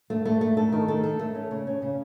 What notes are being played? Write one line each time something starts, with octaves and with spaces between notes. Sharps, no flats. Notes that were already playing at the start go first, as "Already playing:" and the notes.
A3
A3
A3
A4
D#3
A4
A4
A3
C#4
C#3
C#4
C#3